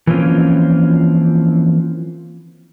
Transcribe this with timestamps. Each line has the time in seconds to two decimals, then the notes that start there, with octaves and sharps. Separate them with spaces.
0.07 E3 F3 A#3 C4 C#4 F4